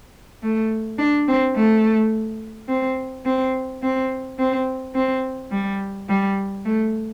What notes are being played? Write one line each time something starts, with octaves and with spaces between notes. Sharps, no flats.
A3
D4
C4
A3
C4
C4
C4
C4
C4
G3
G3
A3